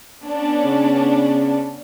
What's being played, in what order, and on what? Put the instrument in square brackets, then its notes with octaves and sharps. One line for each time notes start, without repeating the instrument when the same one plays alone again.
[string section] B3 C#4 D4
[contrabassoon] C#3